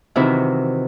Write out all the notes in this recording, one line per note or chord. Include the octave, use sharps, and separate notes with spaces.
C3 D#3 E3 D#4 E4 F#4